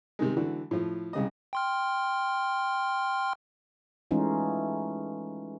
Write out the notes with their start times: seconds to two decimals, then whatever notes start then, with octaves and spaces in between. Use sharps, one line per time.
0.19 C3 D#3 G#3
0.37 D3 E3 D4 F#4
0.71 A2 F3
1.13 C2 C#3 D#5
1.53 G5 C6 F6
4.11 E3 G#3 A3 C#4 D#4 F4